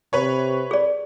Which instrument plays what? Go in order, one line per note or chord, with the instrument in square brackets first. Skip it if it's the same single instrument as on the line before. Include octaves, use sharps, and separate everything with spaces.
[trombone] C3 [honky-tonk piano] B4 C#5
[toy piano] G#4 D5